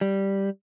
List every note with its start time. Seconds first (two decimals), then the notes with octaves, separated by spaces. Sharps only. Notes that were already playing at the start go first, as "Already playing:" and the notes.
0.01 G3